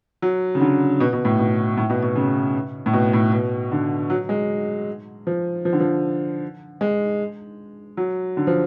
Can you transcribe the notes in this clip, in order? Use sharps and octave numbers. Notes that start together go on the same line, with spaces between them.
F#3
C#3
D3
B2
B2
A2
B2
A2
B2
B2
C#3
A2
B2
A2
B2
D3
F#3
G#3
F3
F3
D3
F3
G#3
F#3
D3
F3